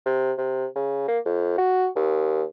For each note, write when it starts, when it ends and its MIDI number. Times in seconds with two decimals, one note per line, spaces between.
0.06 0.32 48
0.38 0.66 48
0.76 1.07 49
1.08 1.19 58
1.26 1.54 41
1.58 1.87 66
1.96 2.43 39